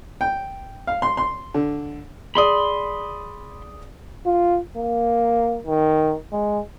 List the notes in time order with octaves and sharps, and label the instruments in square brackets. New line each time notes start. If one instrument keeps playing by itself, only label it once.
[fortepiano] G5
F5
C6
C6
D3
[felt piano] G#4 D5 D#6 [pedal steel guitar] B5 C6
[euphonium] F4
A#3
D#3
G#3